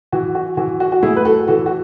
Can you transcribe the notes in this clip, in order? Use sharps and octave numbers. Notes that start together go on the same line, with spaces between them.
E3 F#4
F#4
E3 F#4
F#4
F#4
A2 E4 G#4
B4
F#4 A4
E3 F#4 A4
F#4